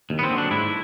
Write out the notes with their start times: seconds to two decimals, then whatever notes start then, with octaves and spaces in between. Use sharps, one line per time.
0.10 D#2
0.19 B3
0.24 C4
0.31 D3 F#3
0.38 D4
0.51 G#2 E4